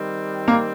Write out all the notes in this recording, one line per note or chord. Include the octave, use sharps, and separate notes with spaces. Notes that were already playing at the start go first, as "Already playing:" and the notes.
Already playing: D#3 G3 C4
A#3